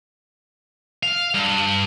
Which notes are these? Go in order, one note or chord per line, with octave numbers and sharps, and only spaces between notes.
F5
G2